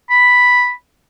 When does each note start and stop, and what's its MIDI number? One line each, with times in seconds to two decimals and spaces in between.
0.10 0.71 83